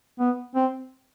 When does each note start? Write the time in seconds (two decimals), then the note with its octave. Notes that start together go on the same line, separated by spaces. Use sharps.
0.20 B3
0.55 C4